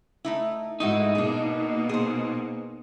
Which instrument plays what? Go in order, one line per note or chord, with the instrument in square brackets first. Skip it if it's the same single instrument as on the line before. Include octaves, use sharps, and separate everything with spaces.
[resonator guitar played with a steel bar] A3 D#4 E4
[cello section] G#2 G#3 [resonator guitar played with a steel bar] A3 E4 F#4 [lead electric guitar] D#4
[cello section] B2 A#3 [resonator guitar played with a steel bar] D4 G#4
[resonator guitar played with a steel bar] G#4 C5